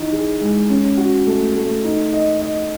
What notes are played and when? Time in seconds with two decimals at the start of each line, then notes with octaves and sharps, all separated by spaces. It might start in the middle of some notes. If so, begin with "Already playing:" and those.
Already playing: E3 D#4
0.12 G#4
0.41 G#3
0.69 C#4
0.97 F#4
1.27 A3
1.55 A3
1.84 D#4
2.13 D#5
2.41 D#5